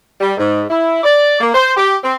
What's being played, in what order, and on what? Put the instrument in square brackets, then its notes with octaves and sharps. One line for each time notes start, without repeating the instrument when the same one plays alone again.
[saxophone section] G3
G#2
E4
D5
A#3
C5
G4
C4